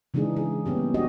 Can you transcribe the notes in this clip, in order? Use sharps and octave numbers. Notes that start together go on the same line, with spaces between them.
C#3 E3 G#3 D4 D#4 G#4
G#4
G3 A#3 B3 C#4 G4
G3
C#4 D4 F#4 G4 D#5